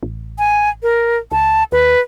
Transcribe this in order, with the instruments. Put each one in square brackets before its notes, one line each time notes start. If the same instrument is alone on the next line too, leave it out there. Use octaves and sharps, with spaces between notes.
[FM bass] A1
[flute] G#5
A#4
[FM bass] C#2 [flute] A5
[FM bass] D#2 [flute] B4